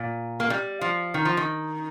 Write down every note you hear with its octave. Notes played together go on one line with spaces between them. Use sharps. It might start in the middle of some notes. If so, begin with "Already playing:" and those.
Already playing: A#2
A#3
G3
F3
D#3
F3
D#3